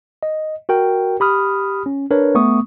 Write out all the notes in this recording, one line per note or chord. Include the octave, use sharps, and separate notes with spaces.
D#5
F#4 A#4 G5
G4 B5 D#6 F6
C#4
D4 A#4 B4 C#5
A3 B3 C#6 D#6